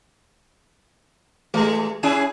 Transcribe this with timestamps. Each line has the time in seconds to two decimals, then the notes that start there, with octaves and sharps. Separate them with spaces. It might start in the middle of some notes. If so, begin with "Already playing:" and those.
1.54 A1 G#3 A3
2.03 C#4 E4 G#4 G#5